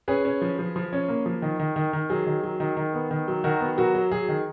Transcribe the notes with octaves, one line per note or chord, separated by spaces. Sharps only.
C#4 G#4 B4
C#4
F3
F3
F3
C#4
A#3
F3
D#3
D#3
D#3
D#3
F#3 G#4
D#3
F#3
D#3
D#3
B3
D#3
F#3
D#3 F#4 A#4
B3
F#3 F#4 A#4
F#3
F#3 G#4
D#3